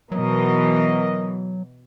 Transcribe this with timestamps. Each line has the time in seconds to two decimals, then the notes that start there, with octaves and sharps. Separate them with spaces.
0.12 B2 E3 F#3 A#4 D#5